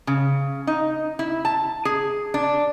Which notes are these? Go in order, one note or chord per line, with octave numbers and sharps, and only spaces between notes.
C#3
D#4
E4
A5
G#4
D4